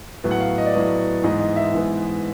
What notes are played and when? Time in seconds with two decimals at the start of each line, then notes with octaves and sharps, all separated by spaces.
0.24 A2 F#3 B3
0.31 F#5
0.40 F5
0.58 D#5
0.66 D5
0.73 A2 F#3 B3 D#5
1.23 G#2 E3 G#3 B3 D#5
1.40 D#5
1.56 E5
1.74 G#2 E3 G#3 B3